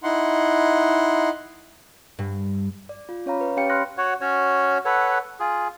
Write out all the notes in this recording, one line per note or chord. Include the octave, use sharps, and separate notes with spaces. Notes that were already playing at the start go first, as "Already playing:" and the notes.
D#4 E4 F#5 C6
G2
D5
F4
C#4 C#5 F5 A#5 B5
B4
C#4 G4 C#5 F5 G5 C#7
B5 C6 F6 F#6 A#6
F#4 C#5 F#5
C#4 F#4 C#5
A4 B4 C#5 F#5
F4 G#4